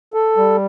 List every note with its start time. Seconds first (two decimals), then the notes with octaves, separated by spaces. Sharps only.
0.14 A4
0.37 G3